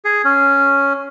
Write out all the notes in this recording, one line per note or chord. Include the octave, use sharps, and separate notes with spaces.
G#4
C#4